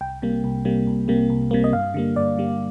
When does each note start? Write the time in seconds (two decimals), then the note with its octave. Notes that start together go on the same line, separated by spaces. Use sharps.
0.01 C2 G5
0.22 C3 G3 A#3
0.44 C2
0.65 C3 G3 A#3
0.87 C2
1.08 C3 G3 A#3
1.30 C2
1.51 C3 G3 A#3
1.64 D#5
1.73 G2 F5
1.94 D3 G3 A#3
2.16 G2 D5
2.38 D3 G3 A#3